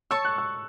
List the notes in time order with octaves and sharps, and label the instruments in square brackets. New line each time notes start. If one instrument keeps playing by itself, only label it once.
[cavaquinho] C#5 A5 C#6 [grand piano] E6
[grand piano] F#6
E6